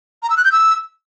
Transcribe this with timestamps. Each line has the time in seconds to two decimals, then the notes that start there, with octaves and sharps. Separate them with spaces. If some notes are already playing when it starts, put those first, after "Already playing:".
0.23 A#5
0.30 E6
0.37 F#6
0.45 G6
0.52 E6